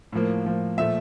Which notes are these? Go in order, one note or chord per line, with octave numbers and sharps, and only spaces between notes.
A2 F3 A#3
A2 F3 A#3
A#2 F3 A3 E5